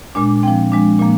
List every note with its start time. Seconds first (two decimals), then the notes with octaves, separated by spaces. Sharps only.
0.15 A#2 G#3 D4
0.43 F3 C4 G5
0.72 F3 G#3 D4
0.99 A#2 F3 A#3